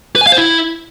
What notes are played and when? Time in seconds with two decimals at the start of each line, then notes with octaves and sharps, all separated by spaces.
0.16 B4
0.21 G#5
0.27 F5
0.32 C5
0.38 E4